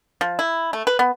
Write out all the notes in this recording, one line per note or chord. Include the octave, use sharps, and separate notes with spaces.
F3
E4
A3
B4
B3